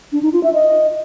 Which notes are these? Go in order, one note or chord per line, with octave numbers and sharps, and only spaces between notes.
D4
D#4
F4
E5
D#5